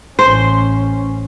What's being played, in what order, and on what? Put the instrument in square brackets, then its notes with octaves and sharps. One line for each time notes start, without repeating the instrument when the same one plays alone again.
[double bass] A1 C#4 [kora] C5 [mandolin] C6